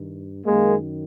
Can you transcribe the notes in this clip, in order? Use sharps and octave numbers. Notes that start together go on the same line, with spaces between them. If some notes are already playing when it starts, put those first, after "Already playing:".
Already playing: G2 D#3
F#2 D#3 G#3 A#3